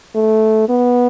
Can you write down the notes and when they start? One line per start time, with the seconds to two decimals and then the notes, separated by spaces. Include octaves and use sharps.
0.15 A3
0.69 B3